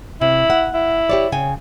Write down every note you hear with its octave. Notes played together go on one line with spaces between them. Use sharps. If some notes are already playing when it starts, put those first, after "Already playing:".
C3 E4
F#5
E4
G4 C#5 D5
C#3 G5 G#5